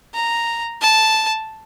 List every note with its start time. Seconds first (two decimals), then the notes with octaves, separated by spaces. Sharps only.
0.15 A#5
0.81 A5